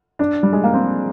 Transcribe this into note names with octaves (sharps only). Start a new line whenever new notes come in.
D4
G3
G#3
A#3
C4